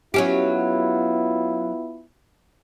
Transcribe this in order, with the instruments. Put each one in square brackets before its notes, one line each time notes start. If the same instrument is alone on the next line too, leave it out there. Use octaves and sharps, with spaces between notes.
[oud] F#3 C#4 G4 [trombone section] B3 E4 F4